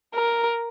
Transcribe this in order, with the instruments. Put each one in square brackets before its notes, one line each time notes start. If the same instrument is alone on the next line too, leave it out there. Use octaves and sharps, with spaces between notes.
[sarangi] A#4